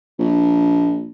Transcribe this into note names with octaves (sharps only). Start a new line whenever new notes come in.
A#1